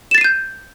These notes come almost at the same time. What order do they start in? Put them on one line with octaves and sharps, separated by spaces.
E7 A6 C7 D#7 G6